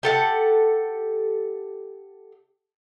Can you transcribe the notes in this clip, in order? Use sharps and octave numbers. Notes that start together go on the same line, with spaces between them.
G4 A4 F#5